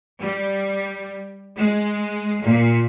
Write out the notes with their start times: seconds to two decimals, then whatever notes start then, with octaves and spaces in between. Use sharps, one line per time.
0.21 G3
1.56 G#3
2.42 A#2